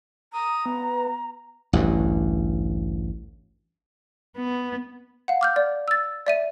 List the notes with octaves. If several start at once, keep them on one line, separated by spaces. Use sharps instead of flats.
A#5 D#6
B3
A1 D2 G2
B3
F5 F#5
D6 F6 G6
D5
E6 A6
D5 E5 D#7